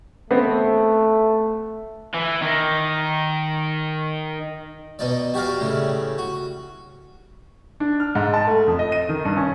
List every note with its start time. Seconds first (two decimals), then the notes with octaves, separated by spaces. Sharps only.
0.31 A3 B3 C4
2.14 E3
2.42 D#3
4.99 B2 D#4 D5
5.34 F#4 G4 A#4 D5 F5
5.61 A2 C#3 G3
6.18 F#4
7.80 D4
8.00 F6
8.15 G#2
8.34 A5
8.47 A3
8.67 F2
8.79 D#5
8.92 D#7
9.09 D#3
9.25 G2
9.37 C#4